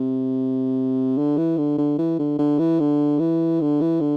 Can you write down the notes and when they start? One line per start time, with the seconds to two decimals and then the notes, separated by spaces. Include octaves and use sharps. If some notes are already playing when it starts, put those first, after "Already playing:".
Already playing: C3
1.18 D3
1.38 E3
1.58 D3
1.78 D3
1.98 E3
2.19 D3
2.39 D3
2.59 E3
2.80 D3
3.19 E3
3.61 D3
3.81 E3
4.01 D3